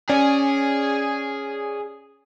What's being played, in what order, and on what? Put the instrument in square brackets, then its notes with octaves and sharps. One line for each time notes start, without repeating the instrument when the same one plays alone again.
[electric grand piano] C#4 C#5 D5 [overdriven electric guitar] G#4